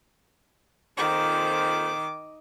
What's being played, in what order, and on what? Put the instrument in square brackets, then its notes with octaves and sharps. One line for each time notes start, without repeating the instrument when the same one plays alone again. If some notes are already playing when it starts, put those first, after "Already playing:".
[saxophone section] F2 A#2 C5 [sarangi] D#3 [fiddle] D6